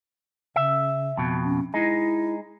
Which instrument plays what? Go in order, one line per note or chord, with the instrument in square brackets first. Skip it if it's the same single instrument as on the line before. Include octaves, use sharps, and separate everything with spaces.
[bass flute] C#3 [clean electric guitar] E5
[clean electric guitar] F2 B2
[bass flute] C#4
[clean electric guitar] G#3 D#4 [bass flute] E4